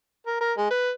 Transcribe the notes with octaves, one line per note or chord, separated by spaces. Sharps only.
A#4
A#4
G#3
B4